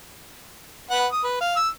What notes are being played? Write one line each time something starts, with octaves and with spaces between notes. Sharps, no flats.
B4 F#5
D#6
B4
F5
E6